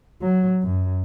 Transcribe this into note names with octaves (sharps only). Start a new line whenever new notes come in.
F#3
F#2